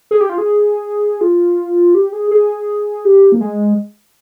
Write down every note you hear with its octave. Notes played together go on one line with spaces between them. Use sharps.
G#4
G4
F4
G#4
F4
G4
G#4
G#4
G4
A#3
G#3